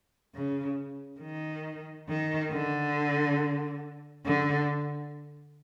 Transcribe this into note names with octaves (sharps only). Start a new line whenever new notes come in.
C#3
D#3
D#3
D3
D3